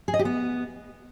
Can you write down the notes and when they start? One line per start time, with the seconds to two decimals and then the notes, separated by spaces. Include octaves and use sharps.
0.08 G#4
0.14 D#5
0.19 G4
0.25 B3